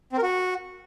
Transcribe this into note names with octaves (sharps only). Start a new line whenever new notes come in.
C4
A#4
F#4